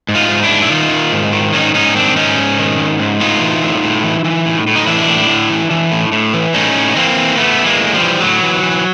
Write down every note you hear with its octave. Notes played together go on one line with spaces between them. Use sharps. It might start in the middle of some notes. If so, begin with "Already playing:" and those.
G#2
D#4 F4
G#2
D4 E4
G#2
E4
D#3 D#4 F4
D#3
G#2
D#3
G#2 C#4 D#4
G#2 C#4 D#4
D#3 C4 D4
G#2 C#4 D#4
G#2
D#3
G#2
G#2
A2 D#4 F4
E3
A2
A2
E3
E3
A2
A2
D#4
E3 D4 E4
A2
A2
E3
E3
A2
A2
E3
A2 C#4 D#4
A2
E3 A#3 C4
E3
E3 A3 B3
E3
G#3 A#3
A2
F3 G3
E3
A2 F#3
E3
E3